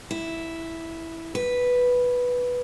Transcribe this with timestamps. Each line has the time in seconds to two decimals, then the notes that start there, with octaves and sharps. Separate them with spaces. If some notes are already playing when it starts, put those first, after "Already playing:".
0.11 E4
1.35 B4